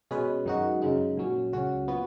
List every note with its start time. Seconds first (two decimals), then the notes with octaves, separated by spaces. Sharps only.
0.11 B2 G#3 C#4 G#4 B4
0.45 F#2 D#3 G#3 D#4 F#4
0.82 F#2 C#3 G#3 D#4
1.17 A#1 A#2 F#3 C#4
1.53 C#2 C#3 F#3 C#4 F#4
1.88 A#2 F3 B3 F#4